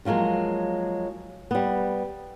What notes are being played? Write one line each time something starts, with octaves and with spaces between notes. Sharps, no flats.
D3 F3 F#3 G#3 A#3
G3 B3